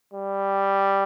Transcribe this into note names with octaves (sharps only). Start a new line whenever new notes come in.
G3